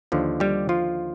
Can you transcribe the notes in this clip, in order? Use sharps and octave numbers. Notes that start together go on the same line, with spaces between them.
D#2 D3 F3
G3 G4
F3 F4